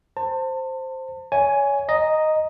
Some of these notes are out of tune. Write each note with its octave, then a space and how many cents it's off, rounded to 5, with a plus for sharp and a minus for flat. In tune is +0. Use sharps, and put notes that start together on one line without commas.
C5 +0 A5 +30
C#5 +25 E5 -15 G#5 +0
D#5 +0 A#5 +0